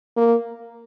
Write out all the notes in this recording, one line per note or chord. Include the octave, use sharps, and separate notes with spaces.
A#3